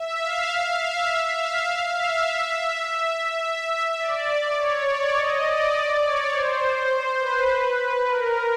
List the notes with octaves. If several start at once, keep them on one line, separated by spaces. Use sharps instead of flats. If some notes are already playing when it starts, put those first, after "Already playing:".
Already playing: E5
F5
E5
F5
E5
E5
E5
D5
C#5
D5
D#5
D5
C#5
C5
C5
B4
A#4